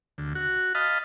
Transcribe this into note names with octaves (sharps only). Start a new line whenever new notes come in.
D2
F#4
D#5 F5 A5 B5